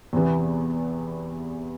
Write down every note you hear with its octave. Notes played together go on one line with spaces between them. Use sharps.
E2 C3 E3 B3